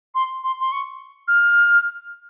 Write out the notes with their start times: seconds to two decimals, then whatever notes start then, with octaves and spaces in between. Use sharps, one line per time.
0.15 C6
0.44 C6
0.60 C6
0.72 C#6
1.28 F6